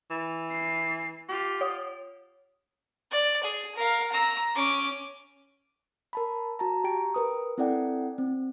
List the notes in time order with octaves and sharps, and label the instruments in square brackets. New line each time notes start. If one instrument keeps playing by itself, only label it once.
[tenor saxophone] E3
[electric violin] C7
[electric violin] F4 [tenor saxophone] G4
[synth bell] C#5 F#5 D#6
[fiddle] D5
G#4
A#4 F5
A#5 E6
C#4 D6
[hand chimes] A#4 A5 B5
F#4 A5 A#5
G4 G5 A#5 D7
A#4 B4 D#6
C4 E4 A4 D5 F#5 G5
C4